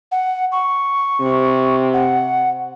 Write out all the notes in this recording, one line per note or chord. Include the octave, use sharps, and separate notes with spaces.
F#5
C#6
C3
F#5